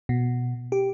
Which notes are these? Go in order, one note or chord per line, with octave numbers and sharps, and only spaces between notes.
B2
G4